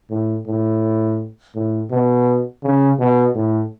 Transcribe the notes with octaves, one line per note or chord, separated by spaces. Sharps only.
A2
A2
A2
B2
C#3
B2
A2